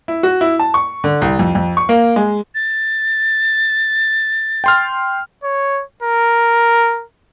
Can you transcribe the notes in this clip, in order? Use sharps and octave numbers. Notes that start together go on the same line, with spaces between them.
E4
F#4
E4
A5
C#6
D3
C2
F2
F2
C#6
A#3
G#3
A6
G5 C6 F6
C#5
A#4